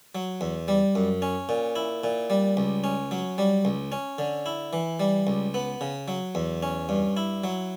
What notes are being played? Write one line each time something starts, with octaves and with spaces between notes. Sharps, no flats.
F#3
E2
G3
F#2
C#4
A#2
E4
A#2
G3
C#2
C#4
F#3
G3
C#2
C#4
D3
E4
E3
G3
C#2
B3
C#3
F#3
E2
C#4
G2
E4
F#3